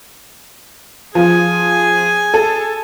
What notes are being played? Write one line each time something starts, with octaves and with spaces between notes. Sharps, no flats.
F3 G#4 G#5
A4